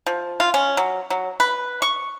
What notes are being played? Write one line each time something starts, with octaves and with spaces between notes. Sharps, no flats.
F3
F4
C#4
F#3
F#3
B4
C#6